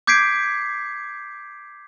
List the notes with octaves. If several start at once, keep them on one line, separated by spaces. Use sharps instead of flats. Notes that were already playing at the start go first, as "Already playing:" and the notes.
D6 G6 G#6 B6 C7 D7